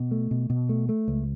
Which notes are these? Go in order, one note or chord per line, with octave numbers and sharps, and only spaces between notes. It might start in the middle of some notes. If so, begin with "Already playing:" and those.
Already playing: B2
A3
B2
B2
A3
A3
C#2